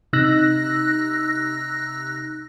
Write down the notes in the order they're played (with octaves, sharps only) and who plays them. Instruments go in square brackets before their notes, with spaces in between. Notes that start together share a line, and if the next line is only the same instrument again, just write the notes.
[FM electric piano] C3 D#4 E6 F#6 A#6